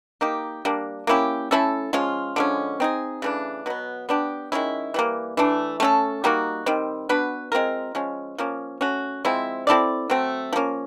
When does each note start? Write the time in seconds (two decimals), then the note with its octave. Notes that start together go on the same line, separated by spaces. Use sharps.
0.21 A#3 D#4 G4
0.65 G3 A#3 D4
1.07 A#3 C#4 E4 G4
1.51 A3 C#4 E4 A4
1.93 F3 G#3 C#4 F4
2.36 D3 F3 G#3 C#4
2.80 C4 D#4 G#4
3.22 C#3 E3 A3 D4
3.66 B2 F#3 B3
4.09 B3 D4 G4
4.52 D#3 G#3 C#4 E4
4.94 E3 G3 A#3
5.37 E3 A3 D4
5.80 A3 C#4 F#4 A4
6.24 G3 A#3 D#4 F#4
6.66 D#3 G3 C4
7.09 B3 D4 F#4 B4
7.52 G#3 C4 F4 A#4
7.95 F3 G#3 C#4
8.38 F3 A#3 C#4
8.81 A3 C#4 F#4
9.25 F3 G#3 C4 E4
9.67 C4 E4 A4 D5
10.10 F#3 A3 C4
10.53 F3 A#3 C#4